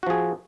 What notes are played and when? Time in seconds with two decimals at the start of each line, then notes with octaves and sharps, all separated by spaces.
0.03 F#4
0.07 F3
0.10 G#4